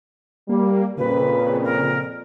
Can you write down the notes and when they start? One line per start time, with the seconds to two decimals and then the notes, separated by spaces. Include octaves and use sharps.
0.49 G3 A#3
0.98 F2 A#2 C#3 B4
1.63 A#4